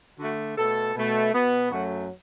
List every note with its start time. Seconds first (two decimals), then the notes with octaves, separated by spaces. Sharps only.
0.20 D3 A3 F#4
0.58 B2 A3 A4
0.95 B2 A3
1.33 B2 B3
1.71 F#2 F#3 A3 F#4